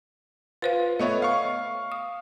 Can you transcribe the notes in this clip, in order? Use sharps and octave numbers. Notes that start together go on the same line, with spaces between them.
F4 B4 C5 F5
A3 B3 C#5 D#5 E5
F5 C#6
D#6